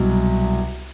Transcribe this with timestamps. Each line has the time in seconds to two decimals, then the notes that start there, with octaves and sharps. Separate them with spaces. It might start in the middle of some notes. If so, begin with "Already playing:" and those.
Already playing: C2 B2 F#3